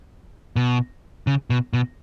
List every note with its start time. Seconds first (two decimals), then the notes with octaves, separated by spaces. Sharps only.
0.56 B2
1.27 C#3
1.50 B2
1.73 B2